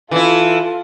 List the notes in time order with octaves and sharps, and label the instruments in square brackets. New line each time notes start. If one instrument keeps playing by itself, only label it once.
[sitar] E3 E4 [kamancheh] F4 A4